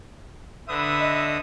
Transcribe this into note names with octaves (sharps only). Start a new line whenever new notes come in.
D3 B4 E5 D#6
D#5